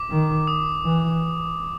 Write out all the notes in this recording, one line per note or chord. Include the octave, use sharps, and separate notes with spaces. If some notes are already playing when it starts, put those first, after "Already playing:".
Already playing: D6
D#3
D#6
E3